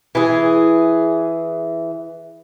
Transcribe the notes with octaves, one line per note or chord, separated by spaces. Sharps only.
E3 G#4